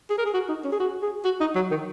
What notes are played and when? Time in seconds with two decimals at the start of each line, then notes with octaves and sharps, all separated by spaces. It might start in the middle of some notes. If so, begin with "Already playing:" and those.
0.10 G#4
0.18 A#4
0.26 G#4
0.34 F#4
0.49 D#4
0.64 C#4
0.72 G#4
0.80 F#4
1.02 G#4
1.25 F#4
1.41 D#4
1.55 F#3
1.71 D#3